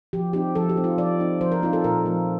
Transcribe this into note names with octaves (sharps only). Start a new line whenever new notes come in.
F3 G4
C4 D#4 G4
F3 A4
G4
C4 D#4
F4
F3 D5
C4 D#4
F3 C5
A#4
C4 D#4 F4
A4
A#2 A#4
F3 A3